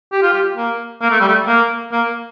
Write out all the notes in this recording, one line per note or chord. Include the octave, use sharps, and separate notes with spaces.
G4
F4
G4
A#3
A#3
A3
G3
A3
A#3
A#3